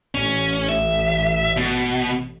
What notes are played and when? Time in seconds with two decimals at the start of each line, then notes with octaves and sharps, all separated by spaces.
0.15 A1 C#4
0.69 E5
1.57 B2